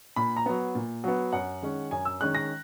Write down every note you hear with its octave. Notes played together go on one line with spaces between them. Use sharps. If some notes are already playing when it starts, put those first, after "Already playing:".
A#2 B5
A#5
F#3 B3
A#2
F#3 B3
F#2 F#5
D#3 G#3 C#4
F#2 G#5
E6
D#3 G#3 C#4 F#6
A#6